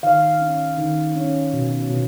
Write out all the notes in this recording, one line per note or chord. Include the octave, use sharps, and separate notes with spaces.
D#3 F5
C#4
D#3
C#4
B2
B2